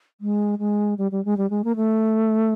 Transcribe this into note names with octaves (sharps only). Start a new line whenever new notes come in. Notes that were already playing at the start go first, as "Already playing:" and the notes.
G#3
G#3
G3
G3
G#3
G3
G#3
A#3
A3